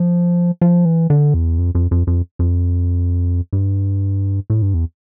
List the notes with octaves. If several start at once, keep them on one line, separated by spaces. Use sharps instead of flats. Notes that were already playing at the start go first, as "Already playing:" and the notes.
Already playing: F3
F3
E3
D3
E2
F2
F2
F2
F2
F2
G2
A2
G2
E2